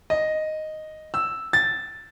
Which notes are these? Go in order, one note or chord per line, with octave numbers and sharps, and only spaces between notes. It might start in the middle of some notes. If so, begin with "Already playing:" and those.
D#5
E6
A6